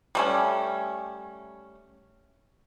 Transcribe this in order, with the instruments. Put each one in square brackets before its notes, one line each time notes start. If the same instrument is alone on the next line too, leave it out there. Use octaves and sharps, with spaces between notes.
[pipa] G3 A3 C#4